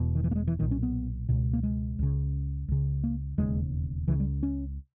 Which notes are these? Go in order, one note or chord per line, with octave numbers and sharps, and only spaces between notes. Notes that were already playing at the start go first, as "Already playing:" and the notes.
Already playing: E1 E2 B2
D#3
E3
A#3
G#3
E3
B1 A#2 D#3
C#4
B3
C#2 B2
A#3
G#3
C#2 C#3
C#2 C#3
A#3
E1 D#2 C#3 G#3
C#2 C#3 E3
G3
C#4